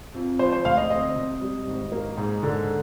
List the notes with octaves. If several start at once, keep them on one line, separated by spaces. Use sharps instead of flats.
F2
F3 C5
C5
D2 F5
D#5
C4 D#5
C3
G3
G#1
A#3
G#2
D3